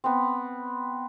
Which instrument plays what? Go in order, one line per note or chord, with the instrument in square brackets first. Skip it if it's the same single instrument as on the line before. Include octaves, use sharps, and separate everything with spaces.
[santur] B3 C4